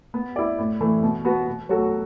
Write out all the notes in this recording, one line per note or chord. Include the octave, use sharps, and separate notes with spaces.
B3
E4 D5
A2
E3 A3
B2
B3 F#4 B4
B2
F#3 A3 F#4 A4